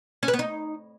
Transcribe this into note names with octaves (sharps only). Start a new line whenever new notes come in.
C#4
B4
B3
D#4